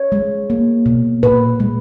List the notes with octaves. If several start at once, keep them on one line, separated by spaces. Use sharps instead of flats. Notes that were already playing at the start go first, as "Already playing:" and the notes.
Already playing: C#5
G#3
A#3
B2
A#2 B4
G#3